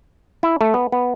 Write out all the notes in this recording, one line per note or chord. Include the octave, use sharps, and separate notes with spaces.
E4
A3
B3
B3